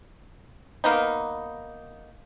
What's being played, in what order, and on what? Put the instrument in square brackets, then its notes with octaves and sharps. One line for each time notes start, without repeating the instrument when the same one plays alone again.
[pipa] A#3 B3 D#4